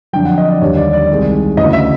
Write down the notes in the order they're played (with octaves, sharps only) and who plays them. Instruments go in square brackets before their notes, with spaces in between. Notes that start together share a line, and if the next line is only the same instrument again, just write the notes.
[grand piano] F2 D3 F#3 G5
F#5
D#5
D5
D#2 D3 G3 C#5
D5
D5
C2 C3 D#3 G#3
D2 C#3 E3 D#5
E5